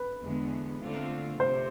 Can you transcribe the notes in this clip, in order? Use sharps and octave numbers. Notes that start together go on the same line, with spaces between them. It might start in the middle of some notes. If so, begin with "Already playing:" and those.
Already playing: B4
E2 D3 G#3 B3
D3 A3 C4 F4
C3 C5